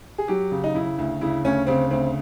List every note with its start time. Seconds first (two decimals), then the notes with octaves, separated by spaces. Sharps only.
0.18 G#4
0.28 F#3 G4
0.52 C#3
0.64 D#4
0.75 C#3 E4
0.98 D2
1.21 C#3 E4
1.44 D2 C#4
1.67 C#3 C4
1.91 D2 C4